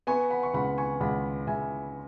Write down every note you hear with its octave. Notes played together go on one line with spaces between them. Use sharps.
B3 G#5 C#6
F#5 B5
C#6
C#2 F#5 B5
G#5 C#6
C#2 F#5 B5
C#2 E5 G#5